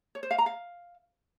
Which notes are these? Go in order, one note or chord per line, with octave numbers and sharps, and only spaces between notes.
C#5
C5
F5
A#5
F5